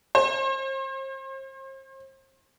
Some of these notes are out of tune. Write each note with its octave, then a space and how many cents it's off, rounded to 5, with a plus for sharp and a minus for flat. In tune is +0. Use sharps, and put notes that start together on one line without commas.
C5 +40